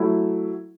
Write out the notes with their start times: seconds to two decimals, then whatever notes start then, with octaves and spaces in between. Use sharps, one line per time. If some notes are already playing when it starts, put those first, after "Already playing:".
Already playing: F#3 A3 E4